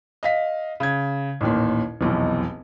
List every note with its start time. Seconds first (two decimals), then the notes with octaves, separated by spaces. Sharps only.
0.23 D#5 F5 B6
0.80 C#3 G#6
1.41 A1 D#2 A#2
2.01 F1 B1 E2